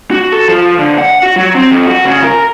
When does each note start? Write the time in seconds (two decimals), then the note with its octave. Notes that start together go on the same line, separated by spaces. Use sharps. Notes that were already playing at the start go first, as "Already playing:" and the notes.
0.11 F#4
0.32 A4
0.48 F3
0.79 D3
0.98 F#5
1.23 F#4
1.36 F#3
1.55 C4
1.71 F2
1.87 F#4
2.05 C#3
2.24 A#4